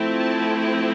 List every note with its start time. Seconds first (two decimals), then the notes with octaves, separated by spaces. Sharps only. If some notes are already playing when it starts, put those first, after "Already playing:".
Already playing: F3 A3 C4 E4
0.19 A5